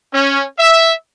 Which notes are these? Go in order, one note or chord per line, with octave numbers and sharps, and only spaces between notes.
C#4
E5